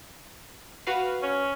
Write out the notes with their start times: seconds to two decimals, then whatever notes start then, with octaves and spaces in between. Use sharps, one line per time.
0.87 F#4 B4 F5
1.22 C#4